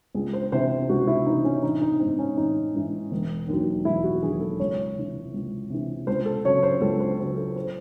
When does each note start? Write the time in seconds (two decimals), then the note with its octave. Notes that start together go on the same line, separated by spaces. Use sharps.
0.15 C#2 G#4
0.33 C5
0.52 C3 E3 C5
0.89 C#2 F#4
1.07 E4
1.26 C3 E3 D#4
1.45 C#4
1.63 A1 D#4
1.82 D#4
2.00 G#2 E3 C4
2.19 C#4
2.37 A1 D#4
2.75 G#2 E3
3.11 E1
3.48 D#2 D#3 F#3
3.85 E1 E4
4.04 F#4
4.23 D#2 D#3 F#3 G#4
4.41 A4
4.60 C#2 C#5
4.97 C3 E3
5.34 C#2
5.70 C3 E3
6.07 C#2 C5
6.26 A4
6.45 C#3 F#3 C#5
6.63 C5
6.81 C#2 A4
7.00 C5
7.19 C#3 F#3 C5
7.37 A4
7.56 C5